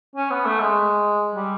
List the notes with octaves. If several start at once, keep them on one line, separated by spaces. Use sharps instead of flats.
C#4
B3
A3
G#3
G3